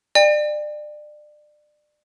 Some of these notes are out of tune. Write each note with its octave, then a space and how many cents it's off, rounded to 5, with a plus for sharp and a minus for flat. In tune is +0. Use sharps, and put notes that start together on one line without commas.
D5 +30 G5 +40